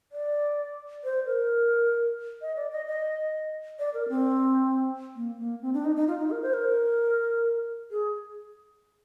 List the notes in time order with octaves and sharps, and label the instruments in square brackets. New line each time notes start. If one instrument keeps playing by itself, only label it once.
[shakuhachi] D5
C5
A#4
D#5
D5
D#5
D#5
D5
A#4
C4
A#3
A#3
C4
D4
D#4
D#4
F4
D#4
A#4
C5
A#4
G#4